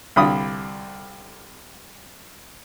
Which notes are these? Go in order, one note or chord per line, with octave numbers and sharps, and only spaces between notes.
C2 D3 F5 B5 D#6